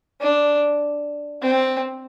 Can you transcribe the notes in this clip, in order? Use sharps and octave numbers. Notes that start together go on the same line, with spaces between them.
D4
C4